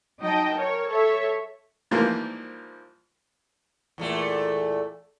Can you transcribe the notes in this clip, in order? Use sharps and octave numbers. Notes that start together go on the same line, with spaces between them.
F#3 D#4 D#5 G5 A5
A#4 C#5
A4 C#5 E5
G#2 E3 F3 G3 A#3
E2 A#2 A3